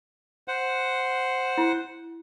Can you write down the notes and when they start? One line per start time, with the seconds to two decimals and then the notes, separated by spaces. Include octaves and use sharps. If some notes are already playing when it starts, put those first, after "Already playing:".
0.48 C5 F#5
1.58 E4